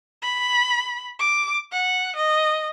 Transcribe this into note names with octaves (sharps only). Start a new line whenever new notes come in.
B5
D6
F#5
D#5